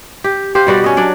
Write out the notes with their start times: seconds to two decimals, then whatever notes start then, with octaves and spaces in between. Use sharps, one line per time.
0.24 G4
0.55 G4 C5 F5
0.67 B2 G3 F#4 D5
0.84 C#4 D#5
0.97 F#3 D4 D5